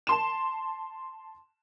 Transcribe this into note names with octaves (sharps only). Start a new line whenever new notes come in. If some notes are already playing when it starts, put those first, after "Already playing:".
A5 C6 E7